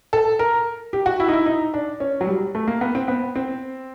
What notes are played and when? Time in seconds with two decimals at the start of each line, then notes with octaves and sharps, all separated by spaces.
0.13 A4
0.39 A#4
0.93 G4
1.06 F#4
1.20 E4
1.28 D#4
1.33 E4
1.46 D#4
1.74 D4
2.00 C#4
2.21 F#3
2.27 G3
2.55 A3
2.68 A#3
2.81 B3
2.95 C4
3.08 B3
3.36 C4